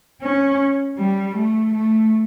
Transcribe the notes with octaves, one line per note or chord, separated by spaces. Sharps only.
C#4
G3
A3
A3